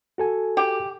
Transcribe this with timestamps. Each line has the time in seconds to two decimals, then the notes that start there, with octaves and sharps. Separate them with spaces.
0.18 F#4 A4 G#5
0.57 G4